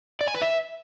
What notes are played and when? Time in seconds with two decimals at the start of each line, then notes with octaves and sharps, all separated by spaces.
0.21 D5
0.28 G#5
0.35 B4
0.41 E5